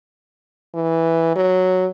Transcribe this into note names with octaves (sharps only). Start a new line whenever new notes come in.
E3
F#3